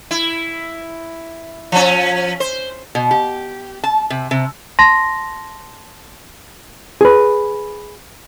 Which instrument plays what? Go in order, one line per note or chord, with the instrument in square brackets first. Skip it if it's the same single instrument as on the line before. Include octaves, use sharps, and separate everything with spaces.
[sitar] E4
F3 C#4
C5
[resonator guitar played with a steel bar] B2
G4
A5
C3
C3
[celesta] A5 C6 A#6
[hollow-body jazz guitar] G#4 B4